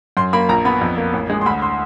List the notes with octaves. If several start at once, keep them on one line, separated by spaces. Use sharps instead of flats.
F#2 C6
A#3 B5
A#1 A#5
B3 B5
F2
A#3
A1
G#3
C6
D2 B5
C6